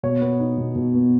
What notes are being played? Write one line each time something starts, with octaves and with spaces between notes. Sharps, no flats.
B2 C#5
B3
D#4
B2
B2
B3